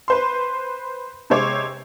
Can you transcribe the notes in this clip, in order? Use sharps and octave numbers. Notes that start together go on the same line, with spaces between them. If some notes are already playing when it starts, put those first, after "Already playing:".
B4 C5 C6
C3 G#3 C5 C#5 D6